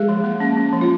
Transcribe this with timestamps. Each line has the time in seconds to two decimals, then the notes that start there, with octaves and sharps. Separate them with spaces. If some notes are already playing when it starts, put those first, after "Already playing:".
Already playing: G#3 G#4
0.09 F3
0.24 A#3
0.40 C#4
0.57 C#4
0.73 F3
0.81 F4